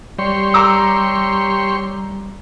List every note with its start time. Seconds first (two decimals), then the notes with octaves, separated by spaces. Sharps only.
0.19 G3 G4 C#5 C6
0.54 A#5 D6 E6